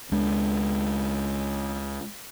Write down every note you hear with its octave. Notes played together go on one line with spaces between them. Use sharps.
C#2 G#3 D4